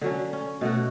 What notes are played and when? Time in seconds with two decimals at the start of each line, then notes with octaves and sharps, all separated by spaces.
0.01 D3 F#3 C#4
0.33 C#4
0.61 B2 A3 F#4